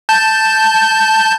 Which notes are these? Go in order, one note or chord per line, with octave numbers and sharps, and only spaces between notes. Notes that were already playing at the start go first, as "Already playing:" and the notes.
A5 G6